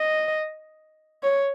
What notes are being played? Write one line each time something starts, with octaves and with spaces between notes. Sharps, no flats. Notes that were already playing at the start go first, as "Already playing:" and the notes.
Already playing: D#5
C#5